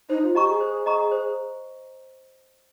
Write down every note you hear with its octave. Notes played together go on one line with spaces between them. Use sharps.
D#4 C5
F4
G4 D#5 A#5 C#6
G#4
C5
D#5 A#5 C#6
C5